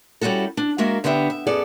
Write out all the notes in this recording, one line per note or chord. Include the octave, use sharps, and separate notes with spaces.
G3 C#4 E4 F#4 A4
D4
G#3 A#3 F#4 A#4 E5 F5
D3 B3 D4 G4 E5
E5
F#2 B3 G#4 A4 D5